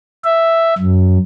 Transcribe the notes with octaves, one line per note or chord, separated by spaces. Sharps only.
E5
F#2